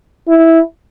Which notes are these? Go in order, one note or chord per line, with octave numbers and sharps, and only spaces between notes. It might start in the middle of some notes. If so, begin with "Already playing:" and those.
E4